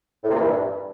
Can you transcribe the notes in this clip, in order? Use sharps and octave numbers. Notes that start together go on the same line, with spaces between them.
A2
C3
A#2
E3
G2